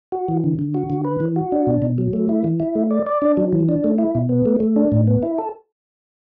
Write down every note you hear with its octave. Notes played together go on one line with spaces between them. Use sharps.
F#4
E3
D3
D3
F#4
D3
B4
E3
F#4
D4
B2
B2
F#3
A3
E4
E3
E4
A3
D5
D5
D4
F#3
E3
D4
A3
E4
B2
B3
A3
A3
D4
A2
B3
E4
A4